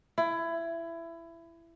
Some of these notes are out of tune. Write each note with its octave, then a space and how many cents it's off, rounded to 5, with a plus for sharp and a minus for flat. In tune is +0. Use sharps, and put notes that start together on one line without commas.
E4 +20